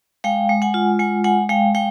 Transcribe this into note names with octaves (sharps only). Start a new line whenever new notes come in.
G#3 F5 G5
G#3
F#5 G#5
F4
G#3 F#5 G#5
G#3 F#5 G#5
G#3 F5 G5
G#3 F5 G5